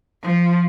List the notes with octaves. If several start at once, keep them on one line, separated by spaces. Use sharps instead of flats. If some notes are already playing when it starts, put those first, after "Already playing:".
F3